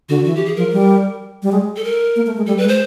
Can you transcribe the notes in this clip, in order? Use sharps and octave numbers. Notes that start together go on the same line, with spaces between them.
D3 F#4
E3 F#4
G4
G#4
F3 A#4
G3
G3
G#3
A4
A#4
A#3
A3
G#3
G3 A4
B4
G#3
C5